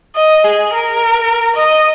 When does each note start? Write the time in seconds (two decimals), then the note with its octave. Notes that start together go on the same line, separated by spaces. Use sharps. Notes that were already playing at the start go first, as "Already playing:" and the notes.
0.16 D#5
0.44 G#4
0.73 A#4
1.56 D#5